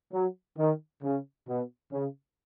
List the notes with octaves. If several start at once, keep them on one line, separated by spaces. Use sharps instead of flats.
F#3
D#3
C#3
B2
C#3